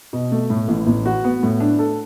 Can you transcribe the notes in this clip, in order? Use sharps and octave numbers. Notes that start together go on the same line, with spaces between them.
B2
A3
A2
A1
A1
F#4
B3
A2
D4
A4